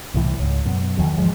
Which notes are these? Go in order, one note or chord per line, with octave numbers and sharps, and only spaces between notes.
C2 A2 E3
C#2 G#2
F#2 B2
E2 D3 D#3 F#3
G#1 E3 F3 G#3